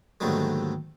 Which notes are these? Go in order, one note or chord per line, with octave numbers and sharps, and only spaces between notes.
D#2 G#2 D3 F#3 G3 A3